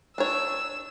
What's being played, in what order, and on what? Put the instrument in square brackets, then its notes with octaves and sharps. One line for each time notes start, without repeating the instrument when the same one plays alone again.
[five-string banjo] D4 C#5 [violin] E6